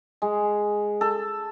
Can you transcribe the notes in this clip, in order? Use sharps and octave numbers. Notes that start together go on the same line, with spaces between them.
G#3
A4